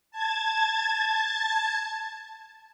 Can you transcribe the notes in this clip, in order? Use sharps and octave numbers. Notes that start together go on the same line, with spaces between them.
A5 G#6 A6